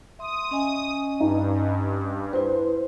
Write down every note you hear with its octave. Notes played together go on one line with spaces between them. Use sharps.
E5 C6 D#6
C#4 D#5 G#5
G2 D#4
E4 B4 C5